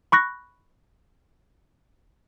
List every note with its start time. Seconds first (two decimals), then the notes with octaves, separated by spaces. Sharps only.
0.12 B5 C#6 F#6 A#6